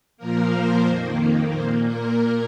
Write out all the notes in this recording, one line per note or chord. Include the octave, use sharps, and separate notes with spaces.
A#2 F3 A#3 A#4
C5
F2 D#3 A#3
A#2 A#3 C5
A#4